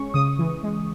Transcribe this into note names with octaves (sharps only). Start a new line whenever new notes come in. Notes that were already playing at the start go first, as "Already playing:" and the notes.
Already playing: G#3 C#4 C#6
C#3 D#6
E3
G#3